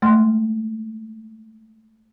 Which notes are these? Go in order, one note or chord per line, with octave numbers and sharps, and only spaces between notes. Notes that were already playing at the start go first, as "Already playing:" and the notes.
G#3 A3 F#5 C6 F6